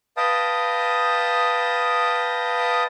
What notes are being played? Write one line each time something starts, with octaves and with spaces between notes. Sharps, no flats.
B4 D#5 F5 G5 A5 D#6